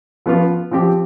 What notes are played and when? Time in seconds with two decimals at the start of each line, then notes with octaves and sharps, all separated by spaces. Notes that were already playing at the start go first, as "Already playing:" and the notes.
0.26 F3 B3 F4
0.71 F3 C4 G4